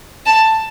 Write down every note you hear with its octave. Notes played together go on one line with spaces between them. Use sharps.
A5